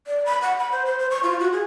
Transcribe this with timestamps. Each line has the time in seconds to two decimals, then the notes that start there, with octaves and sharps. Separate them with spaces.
0.07 D5
0.26 B5
0.42 F#5
0.59 B5
0.72 C5
0.86 C5
0.99 C5
1.11 C#6
1.23 F4
1.40 F#4
1.52 G#4